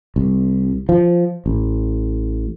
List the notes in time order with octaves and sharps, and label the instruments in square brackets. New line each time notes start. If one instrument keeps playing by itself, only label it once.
[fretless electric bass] C2
F3
A1